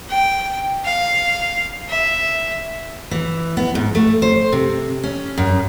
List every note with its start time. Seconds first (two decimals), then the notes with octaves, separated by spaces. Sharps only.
0.10 G5
0.84 F5
1.89 E5
3.11 E3
3.57 B3
3.75 G#2
3.95 A3
4.22 C5
4.52 C3
5.03 C#4
5.38 F#2